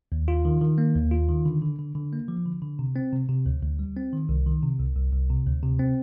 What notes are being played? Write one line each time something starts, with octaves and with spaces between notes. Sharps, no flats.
D#2
F4
D#3
D#3
A#3
D#2
F4
D#3
D3
D3
D3
D3
A#3
F3
D3
D3
C3
C4
C3
C3
D2
D2
G3
C4
D#3
C2
D#3
C3
C2
C2
C2
C3
D2
C3
C4